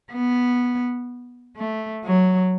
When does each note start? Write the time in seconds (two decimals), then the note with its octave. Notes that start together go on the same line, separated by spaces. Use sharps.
0.12 B3
1.57 A3
2.05 F#3